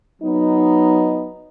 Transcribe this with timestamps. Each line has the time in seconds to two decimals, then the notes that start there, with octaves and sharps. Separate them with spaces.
0.22 F#3 B3 D#4